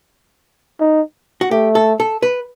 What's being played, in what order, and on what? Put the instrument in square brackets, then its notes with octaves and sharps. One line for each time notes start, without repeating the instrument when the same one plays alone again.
[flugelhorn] D#4
[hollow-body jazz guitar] F#4
[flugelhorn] A3 [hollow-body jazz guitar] G4
[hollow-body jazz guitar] A4
A4
B4